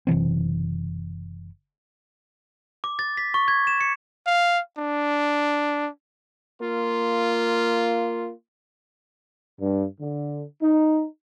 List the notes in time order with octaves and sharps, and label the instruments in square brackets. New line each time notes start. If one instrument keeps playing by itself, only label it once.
[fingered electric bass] F#1 C3 E3 C4
[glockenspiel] D6
A6
B6
C#6
G#6
E7
C#7
[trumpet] F5
D4
[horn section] A#3 F4
[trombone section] G2
D3
D#4